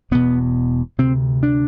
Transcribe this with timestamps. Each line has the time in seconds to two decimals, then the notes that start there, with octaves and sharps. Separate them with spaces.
0.11 E1 E2 B2 B3
0.98 D2 C3 C4
1.43 D4